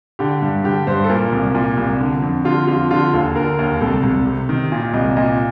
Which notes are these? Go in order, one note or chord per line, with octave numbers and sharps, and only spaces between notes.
D3 G4
G2
D3 G4
G2 C5
A4
A#2 A#4
C2
A#2
C2
D3
F2
D3 F4
F2 F4
D3 F4
D#2 A4
D3 A#4
D#2
C2 A4
C2
C3
D#3
A#2
C2 D#5
A#2 D#5